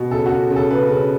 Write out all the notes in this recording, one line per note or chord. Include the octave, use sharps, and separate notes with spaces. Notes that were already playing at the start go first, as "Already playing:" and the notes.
Already playing: B2
C#3 A4
C#3 F#4
C#3
A4
C#3 B4
C#3